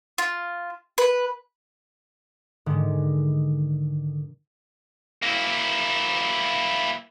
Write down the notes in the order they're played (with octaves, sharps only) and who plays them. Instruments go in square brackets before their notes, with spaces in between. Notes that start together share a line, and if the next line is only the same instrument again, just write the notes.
[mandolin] F4
B4
[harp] G#2 D3 D#3 G#3
[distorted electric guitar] A#3 E4